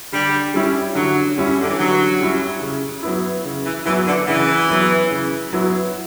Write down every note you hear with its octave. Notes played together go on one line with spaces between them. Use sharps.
D3 G3
G3 C#4 E4
D3 F#3
G3 C#4 E4
D3
E3
D3 F#3
G3 C#4 E4
C#3
F#3 B3 E4
C#3
E3
E3 F#3 B3 E4
D3
C#3 E3
F#3 B3 E4
C#3
F#3 B3 E4